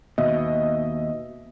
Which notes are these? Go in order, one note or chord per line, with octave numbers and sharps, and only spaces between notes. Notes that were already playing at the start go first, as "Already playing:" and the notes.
D#2 B2 D#5 E5